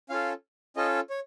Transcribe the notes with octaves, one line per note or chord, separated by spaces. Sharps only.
C#4 F4 A4 F5
C#4 F4 A4 D#5
C#5